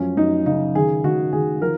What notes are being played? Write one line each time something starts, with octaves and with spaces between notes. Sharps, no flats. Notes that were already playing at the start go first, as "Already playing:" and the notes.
Already playing: F#2 F3 C#4
F#2 D#4
C#3 D#4
D#3 G#4
D#3 F#4
D#3 G#4
F3 A#4